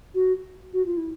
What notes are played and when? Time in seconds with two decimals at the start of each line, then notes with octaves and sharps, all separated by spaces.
0.14 F#4
0.73 F#4
0.86 F4
0.97 E4